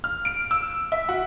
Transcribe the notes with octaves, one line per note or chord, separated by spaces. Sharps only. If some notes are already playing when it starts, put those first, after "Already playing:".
F6
D7
E6
E5
F#4